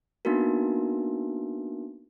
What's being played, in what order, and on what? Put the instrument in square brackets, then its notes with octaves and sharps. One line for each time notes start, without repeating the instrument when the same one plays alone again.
[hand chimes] A#3 B3 D4 D#4 F#4 A#4